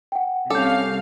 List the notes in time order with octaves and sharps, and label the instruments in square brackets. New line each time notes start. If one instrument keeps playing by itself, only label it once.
[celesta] F#5 G5
[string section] C2 F5 [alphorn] C#4 [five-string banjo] A4 [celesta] D6 G6